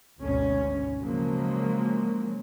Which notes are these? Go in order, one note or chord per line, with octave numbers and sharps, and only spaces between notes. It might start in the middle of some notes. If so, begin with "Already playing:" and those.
G#1 D2 G#2 B2 C#4
C#3 F3 F#3 G#3 A#3